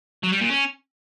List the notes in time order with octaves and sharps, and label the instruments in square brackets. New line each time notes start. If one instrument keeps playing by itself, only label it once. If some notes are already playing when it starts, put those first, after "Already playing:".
[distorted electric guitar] F#3
G3
A#2
C#4